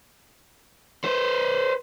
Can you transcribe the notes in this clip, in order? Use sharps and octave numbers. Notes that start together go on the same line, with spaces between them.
B4 C5